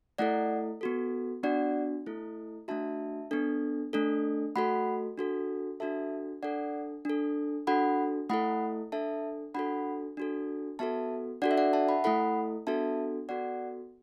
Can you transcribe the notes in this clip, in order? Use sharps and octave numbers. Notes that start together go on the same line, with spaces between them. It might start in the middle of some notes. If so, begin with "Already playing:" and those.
A3 E4 A4 D5 F#5
B3 F#4 A4
B3 D4 F#4 D5 F#5
A3 E4 A4
A3 D4 F#4 E5 A5
B3 D4 A4
A3 D4 A4
A3 F#4 A4 F#5 B5
D4 F#4 A4
D4 F#4 A4 E5 A5
D4 A4 D5 F#5
D4 A4
D4 F#4 A4 F#5 B5
A3 E4 A4 F#5 B5
D4 A4 E5 A5
D4 F#4 A4 F#5 B5
D4 F#4 A4
B3 F#4 A4 E5 A5
D4 F#4 A4 D5 F#5
E5
D5 F#5
E5 A5
F#5 B5
A3 E4 A4 F#5 B5
B3 D4 F#4 A4 E5 A5
B3 F#4 A4 D5 F#5